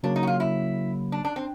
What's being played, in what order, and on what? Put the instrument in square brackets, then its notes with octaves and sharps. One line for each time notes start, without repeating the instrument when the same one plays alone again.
[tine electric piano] C#3 F#3 A#3 [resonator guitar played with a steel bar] D4
[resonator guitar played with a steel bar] D#4
F#4
F4
E4
D4
D4
C4